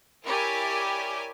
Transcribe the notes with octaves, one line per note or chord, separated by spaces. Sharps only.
E4 G4 A#4 C#5 D5 G#5